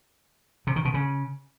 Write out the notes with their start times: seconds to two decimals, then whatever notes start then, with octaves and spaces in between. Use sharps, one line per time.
0.67 C3
0.76 D#3
0.85 B2
0.94 C#3